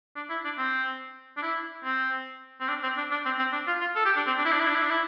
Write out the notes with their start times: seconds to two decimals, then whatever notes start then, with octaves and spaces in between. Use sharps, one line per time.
0.16 D4
0.30 E4
0.44 D4
0.58 C4
1.37 D4
1.42 E4
1.84 C4
2.60 C4
2.69 D4
2.83 C4
2.97 D4
3.11 D4
3.25 C4
3.39 C4
3.52 D4
3.67 F4
3.81 F4
3.96 A4
4.05 G4
4.16 D4
4.27 C4
4.38 D4
4.45 E4
4.52 D4
4.59 E4
4.67 D4
4.75 E4
4.82 D4
4.90 E4